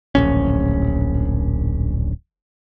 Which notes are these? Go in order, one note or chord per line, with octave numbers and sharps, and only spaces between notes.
D1 A#1 C#4